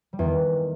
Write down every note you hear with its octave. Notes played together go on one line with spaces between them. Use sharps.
G3
E2
D#3